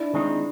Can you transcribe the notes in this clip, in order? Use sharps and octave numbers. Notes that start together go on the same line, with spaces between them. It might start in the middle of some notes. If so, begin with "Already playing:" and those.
Already playing: D4 E4
D#3 G#3 C4 D#4